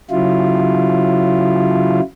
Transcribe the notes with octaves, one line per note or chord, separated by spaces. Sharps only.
C#3 F#3 E4 F4